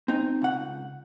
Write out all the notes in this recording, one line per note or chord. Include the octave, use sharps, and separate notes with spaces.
C4 D#4
C#2 F#5